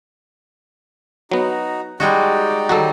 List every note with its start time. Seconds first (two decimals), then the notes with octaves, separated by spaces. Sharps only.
1.32 F#3 B3 D#4 F#4
2.00 G3 G#3 D#4 F#4 G4 D5
2.69 D#3 F#3 G3 F#4 A4